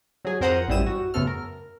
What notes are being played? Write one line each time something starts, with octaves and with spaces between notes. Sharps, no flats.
F#3 G#4
F2 A#4 C5 F#5 A#5 D#6
A1 F#2 G3 E4 D#6 E7
F#4
F#2 C#3 A3 B3 A4 F6
A#4